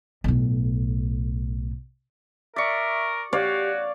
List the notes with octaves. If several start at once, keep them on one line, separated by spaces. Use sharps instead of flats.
B1 A2
A#4 D5 E5 C#6
F#4 G4 C#5 D5 F5